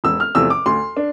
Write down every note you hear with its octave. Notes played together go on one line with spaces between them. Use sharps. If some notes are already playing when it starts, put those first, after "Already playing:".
E1 E6
F6
E2 C3 F3 A3 E6
D6
D2 C6
D4